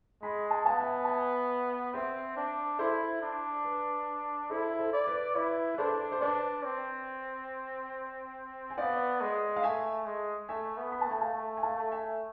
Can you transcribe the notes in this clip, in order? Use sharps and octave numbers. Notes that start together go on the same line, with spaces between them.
G#3 G#5 B5
A5
G#5
B3 F5 A5
E5 G#5
A5
E5 G#5
C4 C5 E5
D4
E4 A4 C5
D4
B4
E4 A4 C5
A4 C5
D5
B4
E4 B4
B4
D4 A4 C5
C5
D4 B4 D5
C4
G#5
B3 D5 F5
G#3
F5
A3 E5 G#5
G#3
A3 E5 G#5
B3
B5
A5
A3 G#5
F5 A5
A3
G#5
F5 A5
A3
E5 G#5